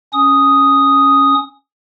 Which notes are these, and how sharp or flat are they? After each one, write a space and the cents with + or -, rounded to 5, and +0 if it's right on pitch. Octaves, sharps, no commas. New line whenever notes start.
C#4 +0 D#6 +0